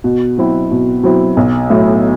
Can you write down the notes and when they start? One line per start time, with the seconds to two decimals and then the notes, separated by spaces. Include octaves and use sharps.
0.04 B2
0.38 F#3 C4 E4
0.71 B2
1.03 F#3 C4 E4
1.37 B1
1.70 A2 F#3